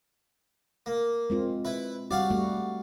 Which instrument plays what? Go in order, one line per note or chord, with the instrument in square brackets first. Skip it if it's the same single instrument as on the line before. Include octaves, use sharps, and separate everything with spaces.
[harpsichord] A#3
[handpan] G#3 C4 F4
[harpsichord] E4 B4
[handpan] G3 F#4 [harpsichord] D5 F5 F#5
[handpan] G3 A3 F#4